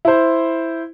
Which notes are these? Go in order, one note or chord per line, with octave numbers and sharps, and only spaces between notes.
E4 C5